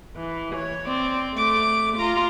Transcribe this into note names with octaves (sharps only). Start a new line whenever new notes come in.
E3
C#5
C4 D5
A3 D6
F4 A#5